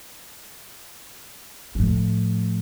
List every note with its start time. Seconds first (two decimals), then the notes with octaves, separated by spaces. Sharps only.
1.75 A2 F3